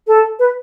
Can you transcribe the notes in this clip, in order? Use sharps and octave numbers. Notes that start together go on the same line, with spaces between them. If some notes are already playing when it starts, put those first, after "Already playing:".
A4
B4